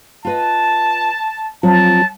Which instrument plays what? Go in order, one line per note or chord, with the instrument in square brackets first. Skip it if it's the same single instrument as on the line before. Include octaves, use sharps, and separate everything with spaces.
[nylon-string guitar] F4 B4 D#5 [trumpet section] A5
[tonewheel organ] F3 C4 F4 [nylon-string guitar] F#3 [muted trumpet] A5